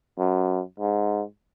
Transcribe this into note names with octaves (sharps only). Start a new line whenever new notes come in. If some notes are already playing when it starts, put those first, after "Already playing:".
F#2
G#2